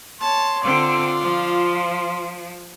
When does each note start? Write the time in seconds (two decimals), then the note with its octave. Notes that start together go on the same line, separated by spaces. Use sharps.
0.21 C#5 A5 C6
0.64 D3 C4 F4 D5
1.20 F3